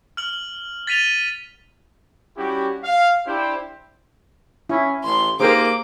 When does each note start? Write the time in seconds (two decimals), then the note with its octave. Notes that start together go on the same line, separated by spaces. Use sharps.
0.17 F6 F#7
0.87 A6 B6 D#7 F7 G7
2.37 G3 C#4 E4 F#4 G4
2.83 F5
3.27 D4 E4 G4 C5
4.69 C#4 E4
5.04 A1 C6
5.40 A#3 D#4 G4 G#4 A#4 C5 D6